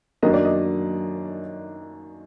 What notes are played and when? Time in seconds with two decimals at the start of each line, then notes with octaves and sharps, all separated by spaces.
0.23 F#2 D#3 F#3 A#3 D4 D#5
0.34 D5
0.45 D#5